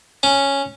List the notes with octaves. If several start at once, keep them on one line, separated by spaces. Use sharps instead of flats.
C#4